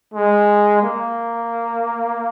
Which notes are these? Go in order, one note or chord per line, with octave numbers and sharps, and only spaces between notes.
G#3
A#3